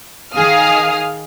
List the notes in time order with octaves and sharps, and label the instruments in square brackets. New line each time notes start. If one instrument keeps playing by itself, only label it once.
[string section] D#3 G#4 F5 D#6 F6